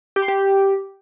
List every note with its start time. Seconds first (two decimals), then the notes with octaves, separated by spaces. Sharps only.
0.16 G4
0.22 C6
0.28 G4